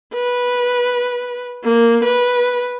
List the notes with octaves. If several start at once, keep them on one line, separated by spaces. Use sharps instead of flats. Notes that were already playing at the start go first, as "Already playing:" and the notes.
B4
A#3
B4